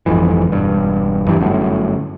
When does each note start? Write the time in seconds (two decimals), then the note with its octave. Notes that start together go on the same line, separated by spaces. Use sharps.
0.06 G1 F2 G#2 E3
0.51 E1 G2
1.27 G2 E3 F#3 G3
1.41 G1 F#2 A2